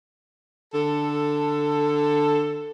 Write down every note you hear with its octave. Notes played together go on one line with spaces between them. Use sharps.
D3 A4